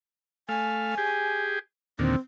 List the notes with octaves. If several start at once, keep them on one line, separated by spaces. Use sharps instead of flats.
A3 F5 G#5
G4 G#4
D#2 A#2 D3 C4